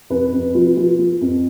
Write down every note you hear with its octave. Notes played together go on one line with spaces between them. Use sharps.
F2 B4
F2
F3
F3
F3
F2